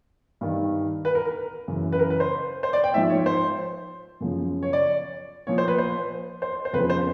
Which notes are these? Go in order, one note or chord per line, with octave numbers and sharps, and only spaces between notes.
G2 D#3
B4
A#4
A#4
F#2 C#3 E3
B4
A#4
B4
C5
C5
D5
G5
G#2 F3 E5
C#5
C5
F#2 C#3 F3
C#5
D5
A#2 F3 C#5
C5
B4
C5
C5
C5
F2 C#3 F3 B4
C5